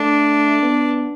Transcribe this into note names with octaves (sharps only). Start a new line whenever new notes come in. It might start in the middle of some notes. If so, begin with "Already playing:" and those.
Already playing: A3 D4
B3